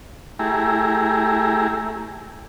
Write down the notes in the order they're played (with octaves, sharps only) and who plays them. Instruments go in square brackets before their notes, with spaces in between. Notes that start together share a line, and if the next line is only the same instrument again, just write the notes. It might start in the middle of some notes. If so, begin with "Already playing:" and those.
[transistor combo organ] A3 E4 G4 G#4 A#5